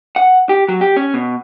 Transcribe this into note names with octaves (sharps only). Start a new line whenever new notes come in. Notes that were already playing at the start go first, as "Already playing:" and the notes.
F#5
G4
F#3
G4
C#4
B2